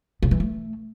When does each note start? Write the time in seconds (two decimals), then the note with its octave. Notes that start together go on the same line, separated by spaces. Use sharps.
0.22 C#3
0.31 E3
0.40 A3